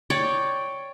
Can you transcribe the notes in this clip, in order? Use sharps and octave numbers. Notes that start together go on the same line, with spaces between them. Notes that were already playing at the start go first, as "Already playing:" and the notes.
C#5 D5 G5